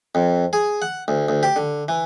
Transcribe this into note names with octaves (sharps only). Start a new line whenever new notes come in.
F2
G#4
F#5
D2
D2
G4
D3
E3